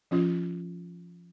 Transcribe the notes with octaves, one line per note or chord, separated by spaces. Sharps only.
F3 C#4 F4